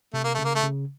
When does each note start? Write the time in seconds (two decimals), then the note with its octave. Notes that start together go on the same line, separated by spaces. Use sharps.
0.13 C3 A3
0.24 A#3
0.34 C#3 A3
0.44 A#3
0.55 A3
0.63 C#3